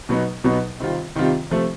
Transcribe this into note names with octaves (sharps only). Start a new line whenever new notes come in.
B2 F#3 B3 D#4
B2 F#3 B3 D#4
C3 D#3 G3 C4 F4
C3 D#3 G3 C4 F4
C3 F3 A3